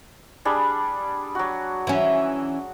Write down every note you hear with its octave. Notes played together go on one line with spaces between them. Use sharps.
G3 D4 G#4
F#3 F#4
E3 C#4